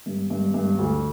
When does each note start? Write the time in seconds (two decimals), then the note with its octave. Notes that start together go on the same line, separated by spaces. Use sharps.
0.06 G2
0.30 G2
0.54 G2
0.79 D2